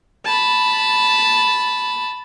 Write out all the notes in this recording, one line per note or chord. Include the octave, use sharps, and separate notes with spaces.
A5 B5